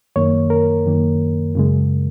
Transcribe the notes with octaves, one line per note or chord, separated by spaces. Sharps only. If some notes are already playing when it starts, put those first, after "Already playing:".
F#2 D#3 A#3 C#5
A#4
F#2 D#3 A#3
F#2 C#3 G#3